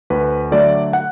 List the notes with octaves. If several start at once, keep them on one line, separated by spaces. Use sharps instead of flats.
D2 B4
D3 F#3 A3 D5
F#5